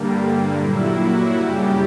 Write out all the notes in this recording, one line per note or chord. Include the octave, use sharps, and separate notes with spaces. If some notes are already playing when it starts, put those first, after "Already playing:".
Already playing: G2 D3 G3 A#3
A#2 F#3 A#3 E4
F#4
F#2 C#3 G3 G4